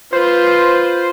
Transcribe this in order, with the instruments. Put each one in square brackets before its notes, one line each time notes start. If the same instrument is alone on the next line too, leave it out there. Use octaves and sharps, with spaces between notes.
[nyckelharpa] F4 B4 [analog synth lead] C5